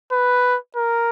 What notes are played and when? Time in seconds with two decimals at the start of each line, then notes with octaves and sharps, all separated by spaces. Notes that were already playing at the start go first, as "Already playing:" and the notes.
0.12 B4
0.76 A#4